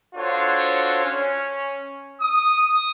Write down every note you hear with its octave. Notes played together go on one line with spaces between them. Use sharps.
D4 F4 F#4 A4 C5 C#5
C#4
D#6